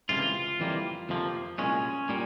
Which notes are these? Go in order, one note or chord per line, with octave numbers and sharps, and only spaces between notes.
C#2 C3 E3 A#3 F4
F2 E3 G3 A#3
F2 C3 F3 A#3
C2 A#2 G#3 C#4
A#2 G3 A#3